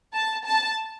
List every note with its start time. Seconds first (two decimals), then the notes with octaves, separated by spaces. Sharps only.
0.14 A5
0.45 A5